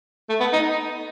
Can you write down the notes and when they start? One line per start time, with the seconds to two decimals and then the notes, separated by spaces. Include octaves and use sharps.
0.29 A3
0.40 B3
0.53 D#4